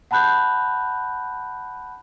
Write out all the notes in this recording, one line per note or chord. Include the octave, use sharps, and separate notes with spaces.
F#5 A5 B5 F#6 G6